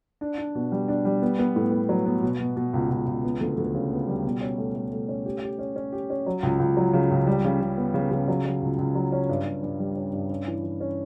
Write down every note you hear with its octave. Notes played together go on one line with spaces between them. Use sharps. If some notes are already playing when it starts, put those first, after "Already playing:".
D4
D4
B2
G3
D4
G3
B3
B3
A2
B3
F#3
B3
B2
B2
B2
C#2
C#2
C#2
B3
D2
D2
C#3
B3
G3
B2
C#4
A3
A3
A3
C#4
G4
G4
C#4
C#4
G4
C#4
F#3
C#2
C#2
F#3
C#3
C#2
G3
C#3
C#3
B3
C#3
C#3
F#3
F#3
C#2
C#2
F#3
C#4
G2
G2
G2
G3
C#4
G2
C#4
E3
E3
C#4